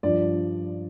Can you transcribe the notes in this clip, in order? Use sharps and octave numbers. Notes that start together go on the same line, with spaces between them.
G2 F3 D5